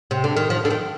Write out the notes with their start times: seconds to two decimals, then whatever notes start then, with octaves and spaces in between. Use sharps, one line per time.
0.11 C3
0.24 D3
0.36 D#3
0.50 F3
0.65 D3
0.70 D#3